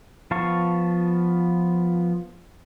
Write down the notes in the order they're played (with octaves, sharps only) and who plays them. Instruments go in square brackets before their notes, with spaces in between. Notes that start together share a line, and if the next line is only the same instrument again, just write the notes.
[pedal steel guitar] F3 B3 F5 A5 C#6